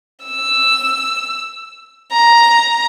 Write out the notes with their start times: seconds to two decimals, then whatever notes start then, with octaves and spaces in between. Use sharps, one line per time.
0.25 E6
2.12 A#5